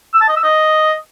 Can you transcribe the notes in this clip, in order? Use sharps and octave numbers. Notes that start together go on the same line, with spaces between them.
E6
A5
D#5
E6
D#5